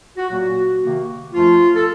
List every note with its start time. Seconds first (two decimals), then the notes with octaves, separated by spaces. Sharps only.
0.17 F#4
0.30 A#2 F#3 A#3 F#4
0.82 C3 D#3 A#3
1.33 F#2 F3 A3 F4
1.75 A4